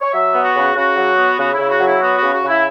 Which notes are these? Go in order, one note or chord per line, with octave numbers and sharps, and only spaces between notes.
C#5
F#3 E5
B3
F#4
C#3
C#3 F#4
F#3
B3
C#3 F#4
E4
C#3
F#4
F#3
E4
B3 F#4
C#3 F#4
F#4
C#3 E4